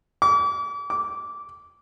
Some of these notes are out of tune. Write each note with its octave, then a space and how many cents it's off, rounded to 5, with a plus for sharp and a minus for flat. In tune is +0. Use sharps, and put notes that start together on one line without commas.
D6 -40
D6 -15